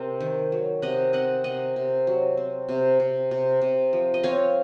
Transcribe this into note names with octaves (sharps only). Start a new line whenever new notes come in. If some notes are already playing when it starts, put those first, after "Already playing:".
Already playing: C3 C4 A#4
D#3
F#3
C3 D#5 F#5
C4 D#5 F#5
C3 D#5 F#5
C3
F#3
C4
C3
C3
C3
C3
F3
D#5
C4 C#5 F5